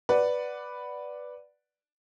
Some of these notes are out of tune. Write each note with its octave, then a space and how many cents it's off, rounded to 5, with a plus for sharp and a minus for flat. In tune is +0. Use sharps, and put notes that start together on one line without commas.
B4 +0 D5 +0 F#5 +0